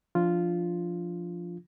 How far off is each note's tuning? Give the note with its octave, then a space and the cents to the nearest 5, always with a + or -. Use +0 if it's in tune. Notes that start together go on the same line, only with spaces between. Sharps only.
F3 +0 D4 +0 F4 -5